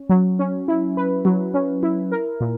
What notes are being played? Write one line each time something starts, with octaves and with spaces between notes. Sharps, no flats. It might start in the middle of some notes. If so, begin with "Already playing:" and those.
Already playing: C#4
F#3
C#4
E4
B4
F#3
C#4
E4
A#4
A#2